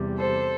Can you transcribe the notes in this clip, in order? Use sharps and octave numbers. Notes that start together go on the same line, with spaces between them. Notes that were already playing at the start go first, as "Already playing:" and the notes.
Already playing: E2 C3 G3
A4 C5